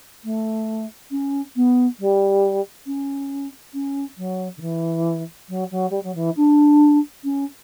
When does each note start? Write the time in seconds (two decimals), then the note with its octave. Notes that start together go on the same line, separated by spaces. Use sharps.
0.24 A3
1.11 C#4
1.56 B3
1.99 G3
2.86 C#4
3.74 C#4
4.17 F#3
4.57 D3
4.61 E3
5.49 F#3
5.71 F#3
5.90 G3
6.03 F#3
6.15 E3
6.36 D4
7.24 C#4